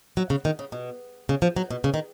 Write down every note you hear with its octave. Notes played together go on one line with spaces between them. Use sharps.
F#3
C#3
D#3
C#3
B2
C#3
F3
F#3
B2
C#3
D#3